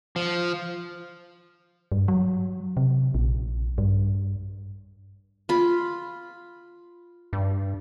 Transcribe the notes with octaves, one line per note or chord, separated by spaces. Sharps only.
F3
G2
F#3
C3
A#1
G2
F4 B5
G2